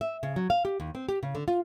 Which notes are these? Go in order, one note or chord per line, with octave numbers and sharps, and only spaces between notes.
E5
C#3
F#3
F5
G4
D#2
C4
G4
C#3
D3
F4